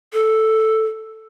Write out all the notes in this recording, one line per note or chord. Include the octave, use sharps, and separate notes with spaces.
A4